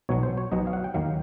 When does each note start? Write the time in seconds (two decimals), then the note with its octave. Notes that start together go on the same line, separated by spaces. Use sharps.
0.09 B1 B2 F#3 C#5
0.23 C5
0.37 C#5
0.52 B1 B2 F#3 D#5
0.67 F5
0.73 F#5
0.84 G5
0.94 D#2 D#3 F#3 F5